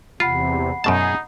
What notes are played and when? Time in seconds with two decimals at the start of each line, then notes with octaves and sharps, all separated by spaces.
0.20 E2 C3 F4 F#5 B5 C7
0.84 F#2 B2 D#4 G#4 A5